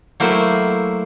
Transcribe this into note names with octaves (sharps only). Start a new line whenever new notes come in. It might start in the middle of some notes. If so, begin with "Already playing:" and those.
F#3 A3 A#3 E4 C5